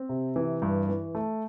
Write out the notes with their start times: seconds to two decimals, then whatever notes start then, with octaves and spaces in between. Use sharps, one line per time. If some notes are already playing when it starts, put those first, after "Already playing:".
Already playing: C4
0.09 C3
0.36 E3
0.62 G2
0.89 E3
1.15 A3